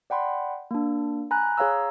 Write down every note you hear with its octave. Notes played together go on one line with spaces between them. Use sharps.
D5 F#5 G5 B5 C6
A#3 D4
G#5 A#5 B5 F#6
G#4 C#5 F5 A#5 E6